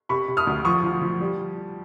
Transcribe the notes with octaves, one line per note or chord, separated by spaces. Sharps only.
C3 B5 C#6
C3
D#6 F6
D2
F3 C#6 D#6
F3
F3
G3